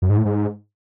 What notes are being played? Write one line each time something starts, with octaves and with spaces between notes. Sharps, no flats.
F#2
G#2
A2
G#2